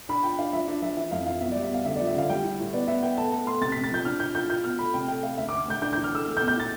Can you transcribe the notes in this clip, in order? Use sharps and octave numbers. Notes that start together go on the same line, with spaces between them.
D4 B5
F4 G5
D4 F5
F3 E5
D4 E5
F3 E5
E3 E5
F2 F5
E3 F5
B2 E5
D5
G3
E5
B2 F5
D3 E5
D5
F3
E5
D3 F5
G3 G5
E4
A2
B3 D5
B3 E5
B3 G5
A3 A5
A3 A5
A3 C6
C3 A6
B6
C3
A6
F3 G6
D4 F6
A2 G6
F4 G6
F4 G6
B2 F6
A3 B5
C3 G5
A3 G5
A3 F5
D2 E5
D6
D2
D2 G6
D4 G6
G6
E3
F6
A3 E6
A3
G6
B2
G6
E4 A6